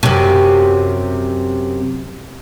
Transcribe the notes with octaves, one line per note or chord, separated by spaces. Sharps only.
F#2 C3